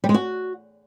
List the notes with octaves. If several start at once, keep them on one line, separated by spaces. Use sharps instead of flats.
G3
G#3
F#4